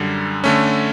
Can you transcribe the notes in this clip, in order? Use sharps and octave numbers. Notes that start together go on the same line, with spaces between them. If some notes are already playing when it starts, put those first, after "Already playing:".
Already playing: F#2 D3 G3
D3 A3 C#4